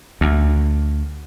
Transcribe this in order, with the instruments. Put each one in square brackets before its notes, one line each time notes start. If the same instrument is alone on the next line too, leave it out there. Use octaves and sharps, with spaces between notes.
[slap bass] D2